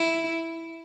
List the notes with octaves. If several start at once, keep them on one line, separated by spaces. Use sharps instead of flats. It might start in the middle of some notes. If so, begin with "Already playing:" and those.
Already playing: E4